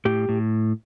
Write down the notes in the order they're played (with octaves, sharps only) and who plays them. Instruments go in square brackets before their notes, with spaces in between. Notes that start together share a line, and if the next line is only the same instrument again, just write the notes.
[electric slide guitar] A2 G4
A2